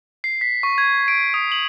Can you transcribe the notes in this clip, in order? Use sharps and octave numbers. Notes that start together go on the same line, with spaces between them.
C7
B6
C#6
G#6
D7
D#6
F#7